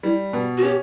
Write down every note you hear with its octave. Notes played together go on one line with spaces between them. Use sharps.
G3 E4
B2
F#4
C#4 G4